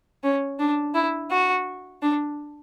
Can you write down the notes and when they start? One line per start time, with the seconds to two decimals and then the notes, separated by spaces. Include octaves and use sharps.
0.24 C#4
0.59 D4
0.94 E4
1.31 F#4
2.02 D4